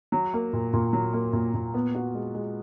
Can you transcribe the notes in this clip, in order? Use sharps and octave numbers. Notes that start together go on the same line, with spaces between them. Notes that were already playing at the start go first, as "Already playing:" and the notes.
F#3
A#3
A#2
A#2
F#3
A#3
A#2
A#2
B3
F#4
G#3
G#3